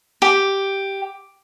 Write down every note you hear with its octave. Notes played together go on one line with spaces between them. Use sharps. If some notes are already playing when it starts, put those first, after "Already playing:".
G4